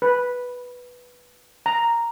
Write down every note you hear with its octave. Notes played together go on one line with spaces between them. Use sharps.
B4
A#5